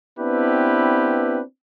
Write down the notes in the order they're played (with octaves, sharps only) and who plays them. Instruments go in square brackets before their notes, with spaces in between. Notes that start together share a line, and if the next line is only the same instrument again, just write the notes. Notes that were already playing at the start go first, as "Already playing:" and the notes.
[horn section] B3 C4 D4 E4 G4 B4